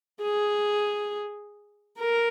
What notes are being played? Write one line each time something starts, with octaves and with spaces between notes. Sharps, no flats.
G#4
A#4